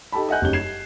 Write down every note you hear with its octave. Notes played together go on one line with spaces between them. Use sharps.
D#4 G4 A4 A5 B5
D#5 E5 F#5 G#5 F#6 G6
F#1 G3 C#4 D#4 G4 G7
G#6 C7 E7